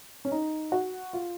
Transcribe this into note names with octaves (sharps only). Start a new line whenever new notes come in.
C#4
D#4
F#4
F4